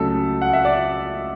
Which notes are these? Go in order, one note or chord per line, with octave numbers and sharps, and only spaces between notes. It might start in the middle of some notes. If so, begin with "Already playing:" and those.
Already playing: C#2 C#3 F#3 A3 A4
F#5
E5
D5